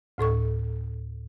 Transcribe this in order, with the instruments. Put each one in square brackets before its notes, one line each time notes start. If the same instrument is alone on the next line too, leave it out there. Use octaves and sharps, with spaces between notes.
[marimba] D2 A2 A4 C#6